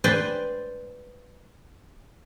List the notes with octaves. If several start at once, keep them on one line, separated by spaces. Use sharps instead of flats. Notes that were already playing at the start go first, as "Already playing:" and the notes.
B4 C5 D5 G5 G#5